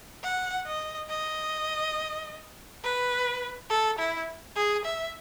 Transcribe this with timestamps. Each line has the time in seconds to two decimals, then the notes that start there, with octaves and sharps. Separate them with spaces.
0.24 F#5
0.66 D#5
1.10 D#5
2.84 B4
3.70 A4
3.98 E4
4.56 G#4
4.85 E5